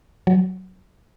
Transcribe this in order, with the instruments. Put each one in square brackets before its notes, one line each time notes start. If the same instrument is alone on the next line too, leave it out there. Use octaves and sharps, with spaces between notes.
[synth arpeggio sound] F#3